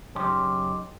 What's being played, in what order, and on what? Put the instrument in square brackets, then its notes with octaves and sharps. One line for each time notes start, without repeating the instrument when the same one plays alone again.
[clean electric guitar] F#2 C#3 C#4 D#4 G4 C6